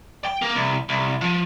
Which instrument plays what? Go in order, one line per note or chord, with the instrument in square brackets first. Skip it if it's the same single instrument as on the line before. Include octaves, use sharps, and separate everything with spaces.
[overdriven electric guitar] G5
A#3
C2
C2
F3